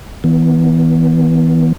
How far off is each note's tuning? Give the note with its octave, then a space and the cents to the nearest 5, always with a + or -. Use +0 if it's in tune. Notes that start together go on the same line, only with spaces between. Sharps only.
E3 -30 B3 +0